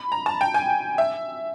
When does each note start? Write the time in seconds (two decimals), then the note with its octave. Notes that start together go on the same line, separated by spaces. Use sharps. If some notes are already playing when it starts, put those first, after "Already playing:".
Already playing: B5
0.12 A#5
0.26 A5
0.41 G5
0.54 G#5
0.98 E5